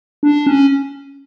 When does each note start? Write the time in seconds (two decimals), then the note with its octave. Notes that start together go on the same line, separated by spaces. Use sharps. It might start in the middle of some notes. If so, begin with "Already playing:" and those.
0.23 D4
0.47 C#4